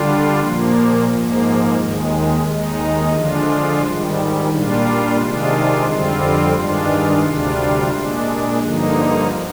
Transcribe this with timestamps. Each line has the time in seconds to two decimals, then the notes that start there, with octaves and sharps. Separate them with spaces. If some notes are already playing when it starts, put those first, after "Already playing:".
Already playing: D3 G3 D4 F4
0.40 A#2 F3 A#3
1.08 G#2 F3 A#3
1.77 D#2 D#3 G#3
2.45 D#2 D#3 G#3 D#4
3.12 D3 F3 G#3 D4 F4
3.81 G#2 D#3 G3
4.49 A#2 G3 D4 F4
5.18 C3 D#3 G#3 D4 F4
5.86 F2 D3 G3 C4 F4
6.54 G2 D#3 G#3 D4 F4
7.22 D2 C3 G3 D4 F4
7.91 A#2 G#3 D4
8.59 G2 D3 F3 A#3 D#4